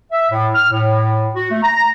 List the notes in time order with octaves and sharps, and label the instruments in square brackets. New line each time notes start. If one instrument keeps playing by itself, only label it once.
[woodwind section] E5
A2
F6
A2
F#4
A3
A#5